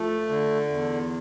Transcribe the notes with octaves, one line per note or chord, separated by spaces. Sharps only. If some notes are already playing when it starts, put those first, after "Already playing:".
Already playing: F3 A3
D3
E2